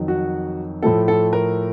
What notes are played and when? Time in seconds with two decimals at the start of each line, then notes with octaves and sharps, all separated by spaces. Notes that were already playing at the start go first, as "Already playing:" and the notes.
Already playing: F2 D#3 F#3
0.08 F#4
0.83 A2 F3 A3 A4
1.08 A4
1.33 A#4